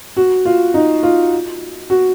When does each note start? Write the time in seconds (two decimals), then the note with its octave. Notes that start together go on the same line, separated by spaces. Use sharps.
0.17 F#4
0.45 F4
0.74 D#4
1.03 F4
1.90 F#4